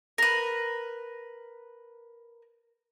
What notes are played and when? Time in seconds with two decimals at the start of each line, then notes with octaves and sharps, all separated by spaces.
0.18 A#4 B4